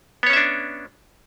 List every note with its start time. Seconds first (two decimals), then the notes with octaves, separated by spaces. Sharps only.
0.23 B3
0.26 C#5
0.30 C#4
0.33 E5
0.37 D4